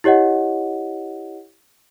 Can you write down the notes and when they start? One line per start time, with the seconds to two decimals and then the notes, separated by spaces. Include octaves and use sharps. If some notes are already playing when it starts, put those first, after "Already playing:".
0.04 E4 G4 C#5 D#5 F#5